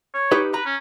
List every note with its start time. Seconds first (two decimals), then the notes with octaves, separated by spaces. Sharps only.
0.14 C#5
0.32 D#4 G4 B4
0.54 B4 A#5
0.66 C#4